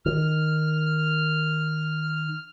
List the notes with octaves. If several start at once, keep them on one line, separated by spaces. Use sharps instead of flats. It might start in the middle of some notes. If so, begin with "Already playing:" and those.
D#3 F6